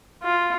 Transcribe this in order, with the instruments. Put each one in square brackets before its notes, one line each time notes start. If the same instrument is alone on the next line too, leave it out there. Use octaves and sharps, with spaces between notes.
[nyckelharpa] F4